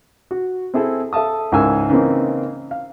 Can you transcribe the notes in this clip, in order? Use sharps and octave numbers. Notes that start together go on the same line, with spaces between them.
F#4
C4 E4 G#4 A4
A4 E5 F5 A5 D#6
C#2 G#2 E4 A#4 G#5 E6
C#3 E3 A#3 C4 D#4
F5